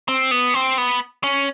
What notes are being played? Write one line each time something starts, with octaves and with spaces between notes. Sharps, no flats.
C4
B3
C4
B3
C#4